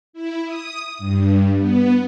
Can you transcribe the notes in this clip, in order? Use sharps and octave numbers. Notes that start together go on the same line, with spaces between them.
E4
D#6
G2
B3